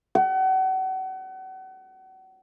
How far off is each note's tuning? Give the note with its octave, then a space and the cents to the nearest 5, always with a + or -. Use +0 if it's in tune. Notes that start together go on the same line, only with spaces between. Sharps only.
F#5 +35